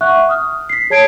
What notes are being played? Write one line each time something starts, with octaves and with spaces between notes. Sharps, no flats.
E5 F#5 C#6 F#6
D#6 F6
B6 C7
G#4 C#5 A5 G#6 C7 D7